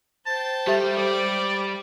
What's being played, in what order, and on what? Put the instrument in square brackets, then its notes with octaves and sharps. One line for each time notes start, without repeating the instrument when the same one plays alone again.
[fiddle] C5 G5 [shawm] A5
[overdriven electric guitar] G3 [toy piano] G4 A4 E5
[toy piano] A4 [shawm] D5